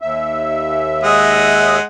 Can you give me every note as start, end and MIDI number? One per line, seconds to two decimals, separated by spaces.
0.02 1.79 39
0.02 1.79 76
1.04 1.83 56
1.04 1.83 75
1.04 1.83 78